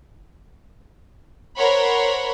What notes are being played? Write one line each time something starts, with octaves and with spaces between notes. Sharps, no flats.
A#4 C5 C#5 F#5 B5 C6